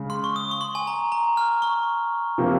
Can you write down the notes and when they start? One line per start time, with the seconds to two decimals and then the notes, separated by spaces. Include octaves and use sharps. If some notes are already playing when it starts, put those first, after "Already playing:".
Already playing: C#3 G#3
0.10 C6
0.24 C#6
0.36 D#6
0.51 C#6
0.61 C6
0.75 G#5
0.87 A#5
1.12 A#5
1.37 F6
1.62 C#6
2.38 C3 F3 A#3